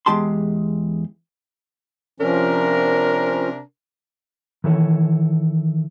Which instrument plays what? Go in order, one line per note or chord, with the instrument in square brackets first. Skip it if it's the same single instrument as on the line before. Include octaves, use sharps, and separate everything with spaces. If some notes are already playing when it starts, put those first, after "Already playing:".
[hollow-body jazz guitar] E2 G#3 G4 A5 C6
[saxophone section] C3 D4 A#4 [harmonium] F3 C#4
[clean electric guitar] D#3 E3 A4 C#5